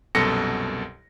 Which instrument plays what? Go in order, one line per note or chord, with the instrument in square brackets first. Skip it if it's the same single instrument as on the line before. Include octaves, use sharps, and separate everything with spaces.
[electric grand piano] C2 F#2 B2 A4 A#6 C#7